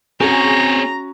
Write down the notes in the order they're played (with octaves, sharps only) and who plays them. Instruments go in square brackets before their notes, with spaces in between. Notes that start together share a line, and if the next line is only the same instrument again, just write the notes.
[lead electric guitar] C4 C#5 [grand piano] C#4 F#4 [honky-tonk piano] G#4 [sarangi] A#5